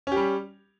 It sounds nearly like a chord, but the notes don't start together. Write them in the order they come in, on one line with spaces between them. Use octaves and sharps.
C#4 G4 G3